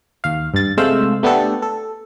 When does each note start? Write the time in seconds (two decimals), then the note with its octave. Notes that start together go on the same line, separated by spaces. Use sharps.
0.24 D#2 F5
0.54 G2 A6
0.77 C3 G#3 A3 C5 F5 E6
1.23 A3 B3 D4 G4 A4
1.62 A4